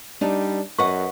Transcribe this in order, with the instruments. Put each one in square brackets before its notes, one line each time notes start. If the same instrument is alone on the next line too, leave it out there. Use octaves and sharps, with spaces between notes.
[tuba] G3 [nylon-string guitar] D4 D#4
[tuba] F#2 [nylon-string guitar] B4 D#5 F#5 [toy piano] C#6